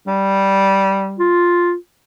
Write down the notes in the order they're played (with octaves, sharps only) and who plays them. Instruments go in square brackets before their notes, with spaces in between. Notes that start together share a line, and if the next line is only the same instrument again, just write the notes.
[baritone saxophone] G3
[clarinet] F4